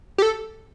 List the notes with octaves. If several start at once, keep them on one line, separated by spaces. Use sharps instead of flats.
G4
A4